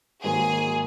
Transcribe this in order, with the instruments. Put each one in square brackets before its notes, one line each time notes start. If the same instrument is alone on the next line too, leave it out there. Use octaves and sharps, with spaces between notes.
[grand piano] G#2 D#3 F#3 A#3 [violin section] G#4